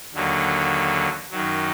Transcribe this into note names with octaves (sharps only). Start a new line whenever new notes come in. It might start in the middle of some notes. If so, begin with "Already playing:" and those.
D#2 D3 F#3
F#2 D#3 F#3